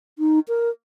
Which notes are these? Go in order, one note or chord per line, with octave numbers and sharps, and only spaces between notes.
D#4
A#4